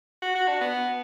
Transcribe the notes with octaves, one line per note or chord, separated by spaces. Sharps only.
F#4
F#4
D4
B3